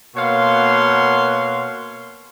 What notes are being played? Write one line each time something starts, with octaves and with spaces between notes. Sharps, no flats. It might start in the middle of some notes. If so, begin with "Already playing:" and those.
B2 A#3 C#5 F5 F#5 C6